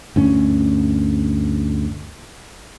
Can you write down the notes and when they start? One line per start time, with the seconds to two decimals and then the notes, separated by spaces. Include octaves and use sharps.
0.16 D2 G2 C#4